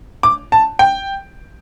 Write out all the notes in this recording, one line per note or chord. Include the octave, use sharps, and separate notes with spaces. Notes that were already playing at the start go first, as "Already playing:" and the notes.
D6
A5
G5